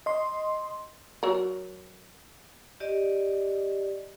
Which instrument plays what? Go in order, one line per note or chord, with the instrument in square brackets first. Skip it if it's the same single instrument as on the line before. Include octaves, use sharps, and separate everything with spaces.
[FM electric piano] D#5 C6
[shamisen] F#3 A#4
[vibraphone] G4 D5 D#5